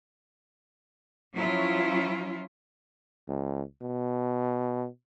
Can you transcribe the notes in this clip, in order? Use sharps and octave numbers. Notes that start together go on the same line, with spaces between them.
F3 F#3 C#4 E4 F4
C#2
B2